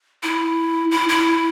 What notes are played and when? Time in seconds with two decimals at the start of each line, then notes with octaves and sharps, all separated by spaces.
0.23 E4
0.91 E4
1.09 E4